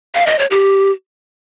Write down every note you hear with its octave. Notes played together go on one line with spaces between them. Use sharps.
F5
D#5
C#5
G4